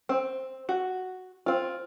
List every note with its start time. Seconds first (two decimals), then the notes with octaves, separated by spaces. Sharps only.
0.09 C4
0.69 F#4
1.46 C4 F4